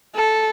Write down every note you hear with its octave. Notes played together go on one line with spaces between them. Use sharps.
A4